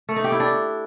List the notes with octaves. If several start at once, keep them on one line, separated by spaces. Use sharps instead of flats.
A3
D#4
G4
E4
D4